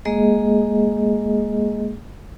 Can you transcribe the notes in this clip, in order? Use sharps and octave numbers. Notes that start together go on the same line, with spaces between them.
G#3 A#3 G#4 D#5